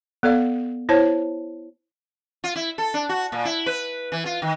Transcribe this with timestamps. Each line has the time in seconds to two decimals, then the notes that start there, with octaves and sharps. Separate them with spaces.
0.23 B3 A4 D5 F5
0.89 E4 C5 C#5 A5
2.44 F4
2.56 E4
2.78 A4
2.94 D4
3.09 F#4
3.32 A#2
3.45 E4
3.66 B4
4.12 E3
4.26 F4
4.42 D#3